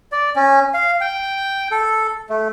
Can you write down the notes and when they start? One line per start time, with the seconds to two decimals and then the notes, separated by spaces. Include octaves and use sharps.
0.12 D5
0.36 C#4
0.74 F5
1.01 G5
1.71 A4
2.30 A3